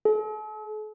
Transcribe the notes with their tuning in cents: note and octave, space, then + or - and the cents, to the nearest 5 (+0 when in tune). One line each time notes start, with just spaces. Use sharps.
A4 -45